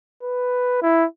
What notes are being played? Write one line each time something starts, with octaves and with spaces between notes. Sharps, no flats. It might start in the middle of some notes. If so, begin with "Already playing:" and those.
B4
E4